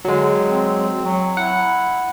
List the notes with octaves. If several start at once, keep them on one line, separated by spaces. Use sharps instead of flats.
D3 F#3 G#3
C4
F#3
E4 F#5